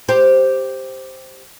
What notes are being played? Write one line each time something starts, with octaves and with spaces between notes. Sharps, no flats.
G4 C5